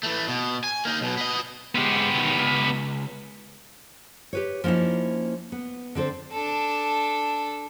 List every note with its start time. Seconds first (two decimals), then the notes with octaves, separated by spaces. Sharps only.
0.03 E3 A3
0.28 B2
0.64 G#5
0.85 A#3 D#4
1.01 B1 B2
1.17 B3 D#5
1.75 G#2 G#3 B3 G4
2.15 B2 D#3
2.37 C#2
4.33 G4 B4 C#5
4.64 F3 A#3 C#4 D#4 E4
5.52 B3
5.95 D3 C4 A4 C5
6.32 D4 A4